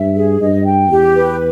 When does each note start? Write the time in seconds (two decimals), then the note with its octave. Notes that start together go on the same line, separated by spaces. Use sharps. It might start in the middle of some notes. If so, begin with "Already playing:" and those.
Already playing: G2 E5
0.15 G#4
0.40 G2 D#5
0.65 G5
0.90 E2 G4
1.15 B4